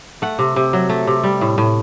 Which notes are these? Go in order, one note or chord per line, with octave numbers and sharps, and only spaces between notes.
A3 F#5
C3
C3
F#3
A3
C3
G3
A2
A2